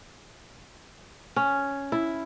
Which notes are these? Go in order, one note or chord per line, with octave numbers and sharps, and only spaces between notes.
C#4
E4